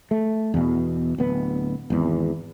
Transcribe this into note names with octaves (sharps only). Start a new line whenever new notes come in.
A3
E2 B2
D1 B3
G#1 E2